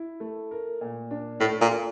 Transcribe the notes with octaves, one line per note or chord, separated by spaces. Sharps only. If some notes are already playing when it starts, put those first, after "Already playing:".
Already playing: E4
A3
A#4
A#2
D4
A2 A3
A#2
F4